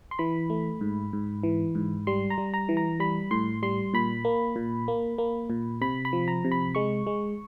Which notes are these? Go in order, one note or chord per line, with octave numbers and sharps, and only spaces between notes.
C6
E3 B5
A3
G#2
G#2
E3
G#2
G3 C6
A#5
G3
A#5
E3
A#5
G3 B5
A2 C6
G3 C6
A#2 B5
A#3
A#2
A#3
A#3
A#2
C3 B5
B5
F3
A#5
C3
B5
G#3 C#6
G#3